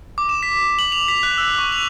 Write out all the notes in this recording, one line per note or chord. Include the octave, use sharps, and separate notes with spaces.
D6
E7
B6
F#7
F7
B6
F#6
E6
C#6
F7